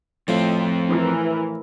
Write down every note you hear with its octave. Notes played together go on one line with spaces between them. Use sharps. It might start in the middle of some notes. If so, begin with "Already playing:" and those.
F2 A2 F3 C4
E3 A#4